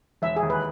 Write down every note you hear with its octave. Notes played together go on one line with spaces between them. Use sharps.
E1 E5
G#4
D#2
B4